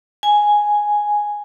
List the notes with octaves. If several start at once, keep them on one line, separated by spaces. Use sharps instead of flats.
G#5